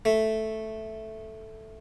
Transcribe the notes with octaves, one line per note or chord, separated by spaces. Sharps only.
A3